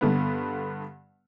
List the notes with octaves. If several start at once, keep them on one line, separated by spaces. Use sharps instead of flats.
G2 D3 B3